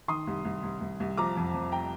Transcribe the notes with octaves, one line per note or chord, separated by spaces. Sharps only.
D#3 C6 D#6
C2
C2
C2
C2
C2
F3 A#5 D6
F2
F2
G5 A#5